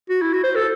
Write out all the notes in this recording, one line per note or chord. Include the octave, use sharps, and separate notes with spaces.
F#4
E4
F#4
C5
A4